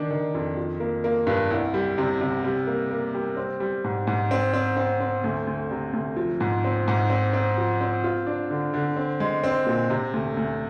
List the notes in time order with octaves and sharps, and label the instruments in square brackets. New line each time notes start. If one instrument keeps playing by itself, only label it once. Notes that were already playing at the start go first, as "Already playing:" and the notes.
Already playing: [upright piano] D#3 D4
D#3
F2
F3
A#3
A#3
G2
C2
G3
C3
C3
G3
A#3
A#3
G3
C4
G3
G#2
G#2
C4
C4
C4
C4
D2
D2
C3
D2
F3
G#2
C4
G#2
C4
C4
F3
C4
F4
D4
D3
D3
C4
G#3
C4
A#2
C3
D2
D2